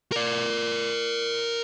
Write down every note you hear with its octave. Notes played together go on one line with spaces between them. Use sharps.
A#4 D5